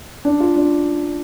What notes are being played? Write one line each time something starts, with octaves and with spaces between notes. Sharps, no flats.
D4
F4
D4